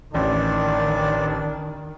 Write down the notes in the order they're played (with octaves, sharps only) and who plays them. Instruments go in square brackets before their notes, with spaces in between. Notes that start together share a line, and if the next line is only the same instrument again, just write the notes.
[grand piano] A1 [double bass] D#3 [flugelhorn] D4 [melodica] D5